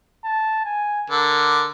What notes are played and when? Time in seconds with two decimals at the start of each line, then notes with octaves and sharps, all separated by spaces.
0.24 A5
0.65 G#5
1.10 D3 A#4